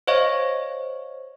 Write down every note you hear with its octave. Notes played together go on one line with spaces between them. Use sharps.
C5 C#5 D#5 F5 C#6